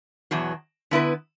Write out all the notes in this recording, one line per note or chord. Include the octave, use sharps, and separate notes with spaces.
E2 B2 F#3
D3 B3 E4 B4